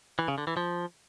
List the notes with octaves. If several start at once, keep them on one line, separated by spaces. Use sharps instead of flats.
E3
C#3
D3
E3
F3